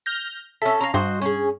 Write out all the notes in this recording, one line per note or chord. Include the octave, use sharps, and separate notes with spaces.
F6 G6 A#6
C#4 A4 E5
C#4 F5 A#5
G2 F#4 C5 D#5
C#4 G#4